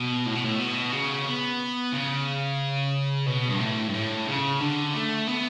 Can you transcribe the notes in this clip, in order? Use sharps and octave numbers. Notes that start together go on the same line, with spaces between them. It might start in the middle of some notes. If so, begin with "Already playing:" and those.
Already playing: B2
A2
B2
A2
B2
C#3
B3
C#3
B2
G2
A2
G2
A2
C#3
D3
A3
B3